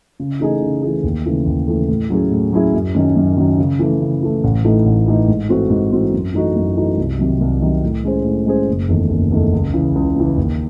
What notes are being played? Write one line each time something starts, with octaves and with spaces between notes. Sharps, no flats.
C#3
E3 A3 D#4 G#4
C#3
E3 A3 D#4 G#4
D#2
C#3 E3 A3
D#2
C#3 E3 A3
A2
F#3 C#4 E4 G#4
A2
F#3 C#4 E4 G#4
F#2
D#3 F#3 C#4
F#2
D#3 F#3 C#4
C#3
E3 A3
C#3
E3 A3
A1
A2 E3 A3 D#4
A1
A2 E3 A3 D#4
G#2
E3 A3 C4 F#4
G#2
E3 A3 C4 F#4
F#2
E3 A3 D#4 F#4
F#2
E3 A3 D#4 F#4
C2
C3 D#3 F#3
C2
C3 D#3 F#3
A2
G#3 C#4 G#4 C5
A2
G#3 C#4 G#4 C5
F#1
E2 D#3 A3
F#1
E2 D#3 A3
C#2
C#3 E3
C#2
C#3 E3
D#2